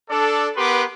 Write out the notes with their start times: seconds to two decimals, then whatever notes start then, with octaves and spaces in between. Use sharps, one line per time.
0.10 D4 A4 D5
0.56 B3 G4 A#4 B4 C6 D6